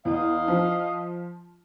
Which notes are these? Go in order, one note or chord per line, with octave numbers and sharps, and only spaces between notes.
E2 D#5 F5
F3